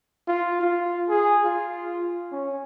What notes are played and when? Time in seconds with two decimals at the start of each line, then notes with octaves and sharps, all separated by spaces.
0.28 F4
0.61 F4
1.09 G#4
1.45 F4
2.32 C#4